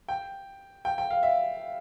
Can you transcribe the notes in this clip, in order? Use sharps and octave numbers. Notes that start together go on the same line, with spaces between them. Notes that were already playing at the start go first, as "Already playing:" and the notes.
G5
G5
G5
F5
E5